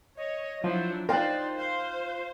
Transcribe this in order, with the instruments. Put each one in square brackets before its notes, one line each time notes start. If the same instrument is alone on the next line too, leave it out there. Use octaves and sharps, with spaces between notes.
[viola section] C#5 [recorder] D#5
[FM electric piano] F3 [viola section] F#3 D4 E4 [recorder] C5
[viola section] D#4 C5 [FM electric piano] F4 F#6 [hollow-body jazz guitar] A#4 G5 [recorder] D5
[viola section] C5 [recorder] F5